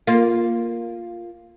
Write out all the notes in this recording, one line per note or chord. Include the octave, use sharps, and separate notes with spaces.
A#3 F4